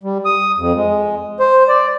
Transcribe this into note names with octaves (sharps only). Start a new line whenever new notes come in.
G3
D#6
F2
G#3
C5
D5